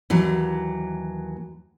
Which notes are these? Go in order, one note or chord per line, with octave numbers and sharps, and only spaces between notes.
D#2 E3 F#3